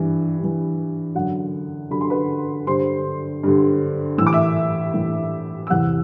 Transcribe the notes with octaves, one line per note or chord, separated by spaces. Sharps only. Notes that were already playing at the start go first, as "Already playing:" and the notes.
Already playing: G2 E3
G2
E3
F#2 D3 F#5
F#2 D3 B5
C6
B4 B5
G2 D3 C5 C6
G2 D3
A2 E3 D6 E6
E5 E6
A2 E3
E6
E2 C3 E3 F#5 F#6